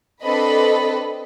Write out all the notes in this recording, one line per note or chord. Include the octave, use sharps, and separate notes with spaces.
C4 D4 A4 B4 D#5 B5